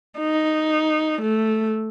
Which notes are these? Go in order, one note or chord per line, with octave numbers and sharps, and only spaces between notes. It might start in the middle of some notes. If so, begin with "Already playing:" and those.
D#4
A3